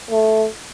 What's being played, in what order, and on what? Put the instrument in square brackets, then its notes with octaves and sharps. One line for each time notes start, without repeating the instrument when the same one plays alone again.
[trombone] A3